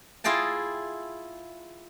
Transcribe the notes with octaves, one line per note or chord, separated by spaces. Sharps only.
E4 F4 G#4 D#5 G5 A5